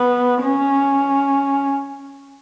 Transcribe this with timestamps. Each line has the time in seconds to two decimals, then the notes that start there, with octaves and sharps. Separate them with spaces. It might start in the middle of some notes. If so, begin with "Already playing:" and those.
Already playing: B3
0.43 C#4